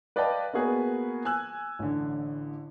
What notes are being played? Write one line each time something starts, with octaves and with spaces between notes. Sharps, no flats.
B4 D5 D#5 F5 G5 A5
A#3 B3 F#4 G#4 B4
G#5 E6 F#6
A1 D3